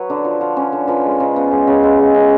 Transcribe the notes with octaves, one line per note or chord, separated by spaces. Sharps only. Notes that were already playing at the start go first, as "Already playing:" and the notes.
Already playing: F#3 B4 C#5
D3
F3
F3
C#4
D3
F3 B4
G#3
C#3
B3
G#3
C#3
G#3
G#3
C#3